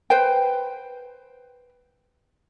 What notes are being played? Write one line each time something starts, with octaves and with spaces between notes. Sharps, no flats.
B4 C5 G5